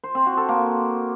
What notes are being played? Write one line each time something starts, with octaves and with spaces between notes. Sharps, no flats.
C5
C4
F#4
A4
A#3